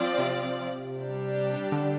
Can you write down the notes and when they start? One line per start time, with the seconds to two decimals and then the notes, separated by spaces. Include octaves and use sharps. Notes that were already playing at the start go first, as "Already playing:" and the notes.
Already playing: F3 C4 F4 D5
0.18 C3
0.95 G3 D4 G4
1.72 D3